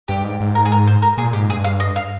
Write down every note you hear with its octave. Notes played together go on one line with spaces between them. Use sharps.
G2 G4
G#2
G#2
A#4
G#4
A#4
C5
A#4
A#2 G#4
G#2 G4
G2 G#4
F5
D#5
F5